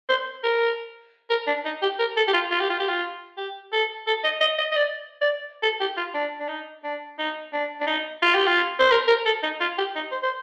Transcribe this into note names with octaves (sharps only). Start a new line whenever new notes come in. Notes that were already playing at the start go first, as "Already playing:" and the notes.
C5
A#4
A#4
D4
D#4
G4
A#4
A4
G4
F4
F4
G4
F4
G4
F4
G4
A4
A4
D#5
D#5
D#5
D#5
D5
D5
A4
G4
F4
D4
D4
D#4
D4
D#4
D4
D4
D#4
F4
G4
F4
C5
A#4
A#4
A4
D#4
F4
G4
D#4
C5
C5